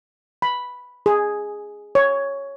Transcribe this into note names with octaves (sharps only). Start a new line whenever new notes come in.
B5
G#4
C#5